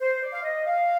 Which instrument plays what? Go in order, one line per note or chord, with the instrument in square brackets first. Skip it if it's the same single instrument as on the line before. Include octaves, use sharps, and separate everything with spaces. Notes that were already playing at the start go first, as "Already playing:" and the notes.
[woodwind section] C5
D5
F5
D#5
F5